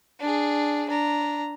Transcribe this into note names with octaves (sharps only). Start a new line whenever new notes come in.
D4 G#4
D4 A#5